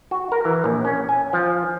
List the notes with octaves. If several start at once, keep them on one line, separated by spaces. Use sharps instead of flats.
F#4
A#4
E3
A#1
C#4
G#5
F3